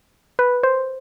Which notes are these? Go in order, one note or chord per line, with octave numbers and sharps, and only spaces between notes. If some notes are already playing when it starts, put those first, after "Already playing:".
B4
C5